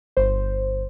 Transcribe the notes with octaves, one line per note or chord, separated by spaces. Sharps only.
G1 C5